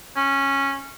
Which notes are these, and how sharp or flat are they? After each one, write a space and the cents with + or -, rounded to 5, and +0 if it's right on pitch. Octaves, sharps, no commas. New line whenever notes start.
C#4 -10